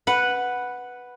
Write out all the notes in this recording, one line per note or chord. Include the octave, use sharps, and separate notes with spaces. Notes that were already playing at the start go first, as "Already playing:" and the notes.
B4 F#5